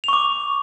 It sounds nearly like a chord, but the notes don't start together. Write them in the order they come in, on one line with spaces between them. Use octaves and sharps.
F7 C#6 D6